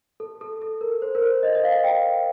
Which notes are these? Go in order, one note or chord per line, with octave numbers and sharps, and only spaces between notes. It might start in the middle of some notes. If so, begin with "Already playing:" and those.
A4
A4
A4
A#4
C5
A#4
C5
D#5
D#5
F5
G5